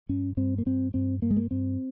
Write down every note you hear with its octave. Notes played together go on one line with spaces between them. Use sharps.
G2 C#4
G2 C4
A#3
G2 C4
G2 C4
G2 A#3
G#3
A#3
G2 C4